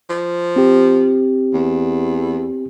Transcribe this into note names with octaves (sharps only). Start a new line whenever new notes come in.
F3
C4 G4
E2